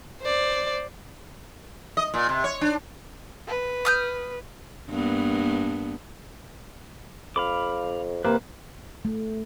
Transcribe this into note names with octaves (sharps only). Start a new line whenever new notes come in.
C5 D5
D#5
A#2
C3
C#5
D4
B4
D#6 F6 G6
G2 A#3 B3
F2 F5 B5 D6
C3 A#3 B4
A3